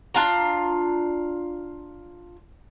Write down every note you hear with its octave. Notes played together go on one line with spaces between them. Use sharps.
D4 F4 A#5